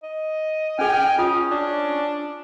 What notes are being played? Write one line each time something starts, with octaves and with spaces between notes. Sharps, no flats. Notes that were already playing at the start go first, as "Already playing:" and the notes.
D#5
C#4 G#4 G5 G#5 F6
C#4 F4 D#6
D4